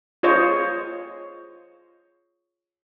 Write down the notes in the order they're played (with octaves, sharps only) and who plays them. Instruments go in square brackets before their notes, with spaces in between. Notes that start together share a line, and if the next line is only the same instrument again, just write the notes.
[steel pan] F4 G#4 C5 C#5 D#5